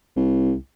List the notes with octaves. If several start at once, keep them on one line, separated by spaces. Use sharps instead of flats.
C2